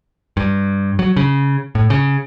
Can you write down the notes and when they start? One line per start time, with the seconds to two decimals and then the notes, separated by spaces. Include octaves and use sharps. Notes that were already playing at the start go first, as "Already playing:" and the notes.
0.37 G2
0.99 F#3
1.16 C#3
1.75 A2
1.90 C#3